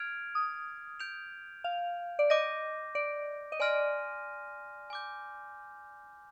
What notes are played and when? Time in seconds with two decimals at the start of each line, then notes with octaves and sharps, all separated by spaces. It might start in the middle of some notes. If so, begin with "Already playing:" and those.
Already playing: F6 G#6 D7 F7
0.35 D#6
1.00 G6 D7 F7
1.64 F5
2.19 D5
2.30 D#5 D6 G6 A#6
2.95 D5
3.52 D#5
3.60 D5 G#5 C6 F6 A#6 D#7
4.90 G#5 D6 G6